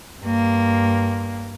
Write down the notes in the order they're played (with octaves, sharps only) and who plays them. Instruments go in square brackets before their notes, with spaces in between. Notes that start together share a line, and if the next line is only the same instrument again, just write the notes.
[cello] G2 A#3